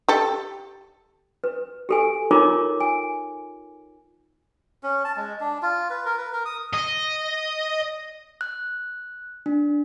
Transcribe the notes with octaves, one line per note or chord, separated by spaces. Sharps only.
G4 A4
B4
G4 A4 G#5
D#4 F4 A#4 C#5 A#5 D6
G#5
C#4
A5
G#3
D4
F4
B4
A#4
B4
A#4
D#6
D#5
F#6
D4